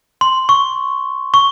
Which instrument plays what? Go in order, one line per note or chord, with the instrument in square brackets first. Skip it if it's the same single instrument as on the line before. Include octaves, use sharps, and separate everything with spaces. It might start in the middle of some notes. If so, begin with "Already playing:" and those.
[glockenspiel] C6
C#6
C#6